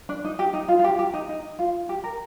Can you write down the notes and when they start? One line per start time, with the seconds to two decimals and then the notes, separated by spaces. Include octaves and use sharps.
0.09 D4
0.25 D#4
0.39 G4
0.53 D#4
0.68 F4
0.79 F4
0.84 G4
0.99 G4
1.14 D#4
1.29 D#4
1.59 F4
1.89 G4
2.04 A#4